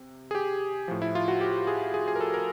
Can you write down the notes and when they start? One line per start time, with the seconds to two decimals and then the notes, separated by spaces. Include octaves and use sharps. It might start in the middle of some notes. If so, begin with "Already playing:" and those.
Already playing: C3
0.31 G#4
0.35 G4
0.88 A2 F3
1.02 E4
1.15 F4
1.28 F#4
1.41 G4
1.67 G#4
1.94 G#4
2.08 G#4
2.16 A#4
2.21 A4
2.34 A#4